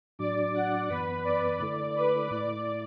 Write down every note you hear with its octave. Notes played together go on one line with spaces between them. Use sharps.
A2 F#3 D4 F#4 D5 D6
F#5
F#2 E3 B3 B4 B5
D5 D6
D3 A3 E4 A4
B4 B5
A2 A3 E4 D5 D6